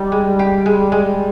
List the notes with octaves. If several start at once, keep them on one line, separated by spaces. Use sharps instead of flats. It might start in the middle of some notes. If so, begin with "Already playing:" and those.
Already playing: G3 D#4
G#3
G4
G#3
G#3